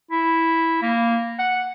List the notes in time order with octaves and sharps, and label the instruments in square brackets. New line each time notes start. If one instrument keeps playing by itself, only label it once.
[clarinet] E4
A#3
F#5